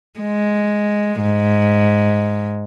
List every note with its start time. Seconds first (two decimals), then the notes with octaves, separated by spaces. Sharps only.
0.20 G#3
1.21 G#2